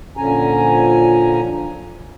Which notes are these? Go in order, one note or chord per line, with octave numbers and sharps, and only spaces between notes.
A#2 D3 F3 C#4 G#5 A#5